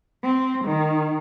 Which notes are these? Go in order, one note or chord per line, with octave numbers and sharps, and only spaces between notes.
C4
D#3